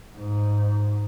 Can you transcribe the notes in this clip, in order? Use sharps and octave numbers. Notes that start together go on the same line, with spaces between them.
G#2